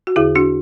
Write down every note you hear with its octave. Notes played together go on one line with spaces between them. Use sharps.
F#4
E2 D3 E4 G#4
D4 F#4